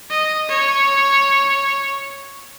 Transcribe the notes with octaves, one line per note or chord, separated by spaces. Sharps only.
D#5
C#5